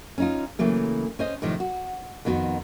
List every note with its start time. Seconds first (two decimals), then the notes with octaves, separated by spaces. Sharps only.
0.18 C#4 D#4 F4
0.59 C#3 E3 F#3 A3 A#3
1.19 C#4 C5 D#5
1.42 A2 C3 D#3 F3
1.60 F#4
2.25 F2 D#3 B3 F#4